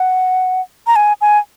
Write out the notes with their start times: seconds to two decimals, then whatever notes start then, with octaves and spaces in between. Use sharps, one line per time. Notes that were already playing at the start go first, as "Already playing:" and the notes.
Already playing: F#5
0.87 A#5
0.96 G#5
1.21 G#5